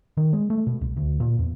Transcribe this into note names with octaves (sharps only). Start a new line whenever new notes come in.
D#3
G#3
A3
B2
C2
D2
A#2
E2